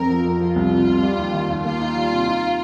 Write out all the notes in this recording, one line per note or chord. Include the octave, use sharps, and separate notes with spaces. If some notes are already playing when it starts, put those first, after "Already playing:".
Already playing: F2 C4 A#4
F3
F2
F3 F4
C2
C3
C2
G3
D#2
D#3
D#2
A#3 F4
D#4
G3
C3
D#4